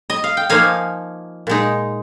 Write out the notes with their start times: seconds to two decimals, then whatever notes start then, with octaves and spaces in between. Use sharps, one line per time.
0.10 D#5
0.24 F5
0.37 G5
0.50 F3 A#3 D#4 F5 G#5
1.47 A#2 G#3 D#4